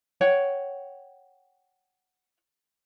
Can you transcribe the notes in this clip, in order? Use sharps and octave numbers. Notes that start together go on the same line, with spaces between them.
C#5 F#5 G5